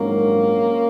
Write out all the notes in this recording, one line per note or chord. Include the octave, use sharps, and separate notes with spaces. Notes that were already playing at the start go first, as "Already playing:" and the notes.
Already playing: A#1 G#2 D#3 F#3 A#3 C#4